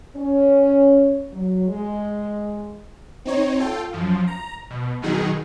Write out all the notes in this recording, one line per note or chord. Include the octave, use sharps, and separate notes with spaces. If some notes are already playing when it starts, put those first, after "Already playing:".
C#4
F#3
G#3
C4 D#4 C#5
F4 A4 G5
F#2 F3
A#5
B2
B2 D#3 F#3 D#4 G#4